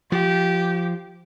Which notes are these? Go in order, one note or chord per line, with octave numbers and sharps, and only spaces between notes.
F3 G4